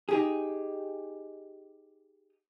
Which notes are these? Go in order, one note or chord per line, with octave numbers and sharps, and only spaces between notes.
D#4 G4 G#4